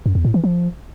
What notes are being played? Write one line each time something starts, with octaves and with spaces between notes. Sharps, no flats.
F#2
E2
A2
E3
F3